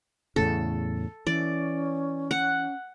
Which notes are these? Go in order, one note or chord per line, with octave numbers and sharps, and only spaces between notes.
E2 A2 C#3 A4
E3 C#4 D5
F#5